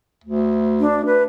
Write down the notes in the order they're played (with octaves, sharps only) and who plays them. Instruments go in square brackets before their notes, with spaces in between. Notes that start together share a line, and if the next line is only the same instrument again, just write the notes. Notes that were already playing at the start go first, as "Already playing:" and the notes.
[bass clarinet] D2
[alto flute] D4
B4